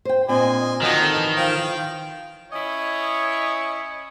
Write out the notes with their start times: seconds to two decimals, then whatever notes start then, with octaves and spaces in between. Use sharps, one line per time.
0.05 C5 G5
0.28 A#2 C4 D4 D#5 G#5 C6
0.82 D3 D#3 F3 F#3 D#5
1.01 A4
1.16 E3
1.37 F3 F5 G5
2.52 C#4 E4 C#5 D#5